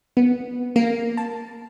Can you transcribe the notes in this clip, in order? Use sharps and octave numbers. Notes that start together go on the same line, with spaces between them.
B3
A#3
A5